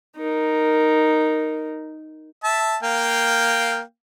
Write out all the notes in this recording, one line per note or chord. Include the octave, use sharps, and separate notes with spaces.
D#4 A#4
E5 A5
A#3 F5 G5